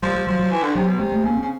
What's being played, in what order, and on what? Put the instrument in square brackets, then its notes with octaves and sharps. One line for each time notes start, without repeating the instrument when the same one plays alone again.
[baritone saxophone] F3 [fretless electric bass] G3
[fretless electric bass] G3
[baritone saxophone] F3 [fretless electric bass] F#3
[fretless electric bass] F#3
[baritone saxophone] E3
D3
[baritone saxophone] C3 [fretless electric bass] F#3
[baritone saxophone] B2
[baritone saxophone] C3 [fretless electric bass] G#3
[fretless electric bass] A3
[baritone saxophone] C#3 [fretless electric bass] A#3
[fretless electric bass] C4
[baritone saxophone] C#3